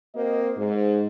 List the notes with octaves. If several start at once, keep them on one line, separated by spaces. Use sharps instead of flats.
A#3 C4 F#4 C5 D#5
G#2